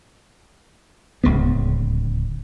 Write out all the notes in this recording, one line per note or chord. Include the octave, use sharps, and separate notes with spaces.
D1 C#2 C#3 B3